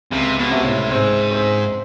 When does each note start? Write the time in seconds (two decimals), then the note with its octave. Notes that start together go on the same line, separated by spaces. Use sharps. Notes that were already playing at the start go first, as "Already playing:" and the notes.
0.11 C#2 C3
0.38 B2
0.51 C3
0.64 A2
0.91 G#2 C4
1.31 C4